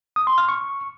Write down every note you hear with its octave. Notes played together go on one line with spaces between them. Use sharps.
D#6
C6
F6
C#6